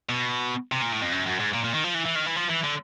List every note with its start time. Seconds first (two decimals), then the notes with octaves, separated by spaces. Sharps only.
0.09 B2
0.72 C3
0.82 A#2
0.92 A2
1.02 F2
1.13 F#2
1.27 F#2
1.40 G#2
1.54 A#2
1.64 A#2
1.74 D#3
1.84 F3
1.94 E3
2.06 E3
2.15 D#3
2.26 E3
2.36 F3
2.50 E3
2.64 D3